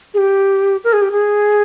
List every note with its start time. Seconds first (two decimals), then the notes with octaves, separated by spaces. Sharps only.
0.14 G#4
0.18 G4
0.84 A#4
0.93 G#4
1.02 G4
1.12 G#4